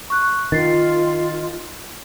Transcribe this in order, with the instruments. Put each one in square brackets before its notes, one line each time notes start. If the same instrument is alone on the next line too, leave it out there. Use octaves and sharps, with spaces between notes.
[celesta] C#6 F#6
[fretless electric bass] D#3 [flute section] F4 [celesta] A6 C7